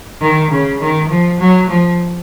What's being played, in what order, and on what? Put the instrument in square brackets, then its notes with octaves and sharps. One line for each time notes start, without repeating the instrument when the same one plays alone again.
[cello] D#3
C#3
D#3
F3
F#3
F3